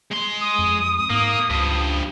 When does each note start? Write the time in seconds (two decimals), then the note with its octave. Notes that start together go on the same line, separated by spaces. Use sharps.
0.12 G#3 C6
0.41 D#6
0.59 F2
1.10 G#2 A#3
1.50 C#2 G2 F3